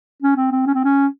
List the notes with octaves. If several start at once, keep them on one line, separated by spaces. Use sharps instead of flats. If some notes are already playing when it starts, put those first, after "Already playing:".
C#4
C4
C4
C#4
C4
C#4